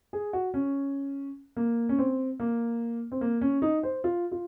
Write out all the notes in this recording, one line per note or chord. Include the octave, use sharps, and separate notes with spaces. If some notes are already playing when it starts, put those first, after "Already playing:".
G#4
F#4
C#4
A#3
C#4
C4
A#3
C4
A#3
C#4
D#4
C5
F4
F4